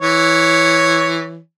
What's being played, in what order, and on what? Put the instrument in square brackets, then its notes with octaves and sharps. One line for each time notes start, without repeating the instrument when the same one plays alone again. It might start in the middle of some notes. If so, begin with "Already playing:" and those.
[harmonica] E3 C#5